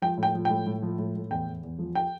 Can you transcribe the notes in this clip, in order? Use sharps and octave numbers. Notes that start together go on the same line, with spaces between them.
F3 G5
A2
G5
F3
A2 G5
A2
F3
A2
A2
E2 G5
E2
E2
F3
G5